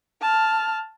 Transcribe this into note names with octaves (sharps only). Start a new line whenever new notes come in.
A5 F6